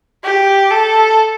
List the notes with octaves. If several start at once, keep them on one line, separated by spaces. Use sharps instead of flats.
G4
A4